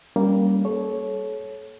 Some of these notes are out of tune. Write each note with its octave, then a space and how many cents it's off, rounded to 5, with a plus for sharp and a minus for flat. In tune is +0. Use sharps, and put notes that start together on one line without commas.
G3 +0 A#3 +0 C#4 +0
A4 -35 C#5 -5